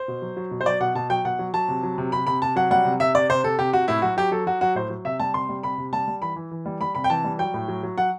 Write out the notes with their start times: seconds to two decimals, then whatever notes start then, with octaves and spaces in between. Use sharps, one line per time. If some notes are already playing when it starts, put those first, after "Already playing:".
Already playing: C5
0.08 B2
0.22 F#3
0.37 F#3
0.51 B2
0.61 C5
0.66 F#3 D5
0.80 B2 F#5
0.95 B2 A5
1.10 F#3 G5
1.25 B2 F#5
1.39 F#3
1.54 F#3 A5
1.68 C3
1.83 F#3
1.98 C3
2.12 C3 B5
2.27 C3 B5
2.42 C3 A5
2.56 F#3 F#5
2.71 G3 F#5
2.85 C3
3.00 C3 E5
3.15 C3 D5
3.29 C3 C5
3.44 C3 A4
3.59 C3 G4
3.73 C3 F#4
3.88 A2 E4
4.02 F#3 F#4
4.17 F#3 G4
4.31 F#3 A4
4.46 F#3 F#4
4.61 F#3 F#4
4.75 A2 C5
4.90 F#3
5.05 C3 E5
5.20 G3 A5
5.34 C3 C6
5.49 G3
5.63 C3 B5
5.78 C3
5.93 G3 A5
6.08 G3
6.22 E3 B5
6.36 E3
6.51 E3
6.66 G3
6.81 G3 B5
6.95 C3 B5
7.04 G5
7.10 E3 A5
7.24 G3
7.39 F#3 G5
7.54 A2
7.68 F#3
7.83 F#3
7.98 F#3 F#5